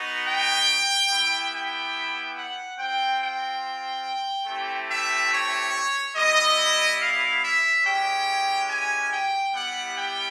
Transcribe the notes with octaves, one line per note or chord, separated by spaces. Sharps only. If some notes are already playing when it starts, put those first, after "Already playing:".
Already playing: B3 D#4 F#4
G5
B3 E4 G4
G5
F#5
C4 F4 G5
G5
A3 C4 E4 G4
E5
C#5
G3 B3 E4 D#5
F5
E5
G#3 C#4 E4 G4 G5
G#5
G5
G3 B3 E4 G4 F#5
G5